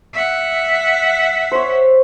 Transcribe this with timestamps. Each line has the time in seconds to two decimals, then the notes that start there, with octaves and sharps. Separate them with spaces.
0.13 E5 F#5
1.52 C5 C#5